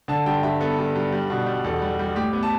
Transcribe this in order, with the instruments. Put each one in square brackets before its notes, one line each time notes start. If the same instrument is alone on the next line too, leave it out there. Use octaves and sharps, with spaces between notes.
[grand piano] D3 A5
G2 G5
G2 E5
B3 A4
G2
G2
G3
B2
G3
E2 A4
G3
G3
A2 G4
B3
A5